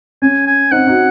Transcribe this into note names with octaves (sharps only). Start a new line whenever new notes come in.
C#4 G#5
G#5
C4 D#4 F#5
D#4 F#4